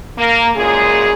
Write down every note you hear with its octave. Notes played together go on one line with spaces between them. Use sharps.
A#3
F#2 A#2 C#3 G#3 G#4